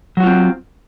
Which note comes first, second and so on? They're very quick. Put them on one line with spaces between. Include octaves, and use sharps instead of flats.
F#3 F#4 F4 C4